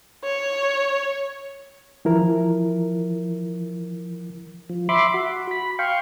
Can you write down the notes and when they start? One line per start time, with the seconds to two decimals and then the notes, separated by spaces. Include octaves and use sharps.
0.24 C#5
2.05 E3 F3 E4 A#4
4.69 F3
4.89 E5 B5 C6 D6
5.14 F#4
5.51 B5
5.79 F5 G5 C6 C#6